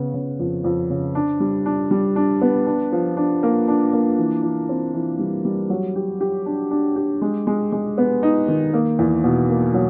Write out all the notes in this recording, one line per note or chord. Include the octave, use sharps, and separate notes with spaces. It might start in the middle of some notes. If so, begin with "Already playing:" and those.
Already playing: C#3 B3
C#3
F2
F2
C#3
D4
G3
D4
G3
D4
B3
D4
F3
D4
A#3
D4
A#3
E3
E3
C4
E3
G3
G3
F#3
G4
G4
D4
D4
G4
G#3
G#3
G#3
B3
D#4
D#3
A#3
E2
B2
A#3
F#3